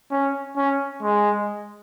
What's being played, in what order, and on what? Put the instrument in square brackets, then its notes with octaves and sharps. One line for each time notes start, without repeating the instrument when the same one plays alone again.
[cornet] C#4
C#4
G#3